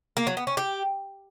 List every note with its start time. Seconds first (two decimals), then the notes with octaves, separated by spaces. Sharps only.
0.17 A#3
0.27 F#3
0.37 B3
0.47 C#4
0.57 G4